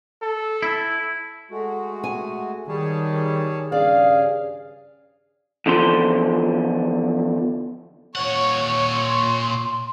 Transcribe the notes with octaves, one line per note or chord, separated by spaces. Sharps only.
A4
E4
G#3 A3 F#4
G#5
D#3 G3 G#4 C#5 A5
G2 C#3 G#4 D5 F5
E2 D3 F3 C6
A#2 C#5 F#5
C6